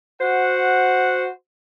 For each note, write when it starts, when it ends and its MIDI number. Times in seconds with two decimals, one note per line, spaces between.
0.21 1.28 66
0.21 1.28 72
0.21 1.28 78